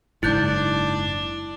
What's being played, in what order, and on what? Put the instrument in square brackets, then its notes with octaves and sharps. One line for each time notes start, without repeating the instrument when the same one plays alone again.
[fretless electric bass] F#1 G#2 [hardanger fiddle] D4 [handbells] E4 F#6 G6